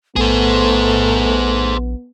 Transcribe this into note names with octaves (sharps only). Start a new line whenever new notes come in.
A#1 A3 B3 G#4 C5